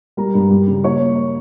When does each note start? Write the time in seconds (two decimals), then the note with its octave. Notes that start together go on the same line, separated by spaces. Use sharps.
0.17 G3 A#4 A#5
0.34 G2
0.51 G3
0.67 C#3
0.84 A#3 C#5 C#6
1.01 A#3